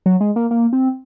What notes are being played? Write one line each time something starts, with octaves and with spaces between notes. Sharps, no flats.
F#3
G#3
A#3
A#3
C4